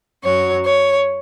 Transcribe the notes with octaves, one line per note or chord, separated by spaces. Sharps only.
F#2 F#3 C#5
C#5